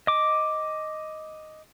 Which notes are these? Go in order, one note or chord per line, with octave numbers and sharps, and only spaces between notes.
D#5 D6